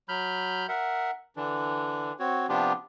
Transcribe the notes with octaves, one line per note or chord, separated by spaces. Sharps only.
F#3 B5 F6 G6
A#4 E5 F#5
D3 E3 D4
C4 F#4 C#5
C3 F3 B3 D4 F4 G4